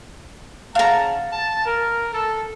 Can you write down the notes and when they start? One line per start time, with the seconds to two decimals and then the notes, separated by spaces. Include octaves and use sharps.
0.75 C#3 F5 F#5 A5 A#5
1.31 A5
1.66 A#4
2.13 A4